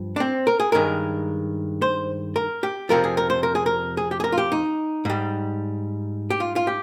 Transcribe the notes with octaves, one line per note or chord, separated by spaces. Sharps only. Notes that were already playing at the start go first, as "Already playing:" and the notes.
Already playing: G2 F3
D4
C4
A#4
G#4
G2 D#3 G#3 A#4
C5
A#4
G4
F2 C3 F3 A#4
G#4
A#4
C5
A#4
G#4
A#4
G#4
G4
G#4
A#4
F4
G4
D#4
G#2 G3
G4
F4
F4
G4